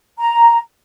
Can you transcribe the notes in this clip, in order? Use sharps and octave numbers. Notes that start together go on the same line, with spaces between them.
A#5